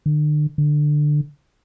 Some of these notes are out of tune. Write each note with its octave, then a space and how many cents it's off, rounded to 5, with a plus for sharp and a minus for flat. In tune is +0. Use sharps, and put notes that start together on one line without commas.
D3 +40
D3 +15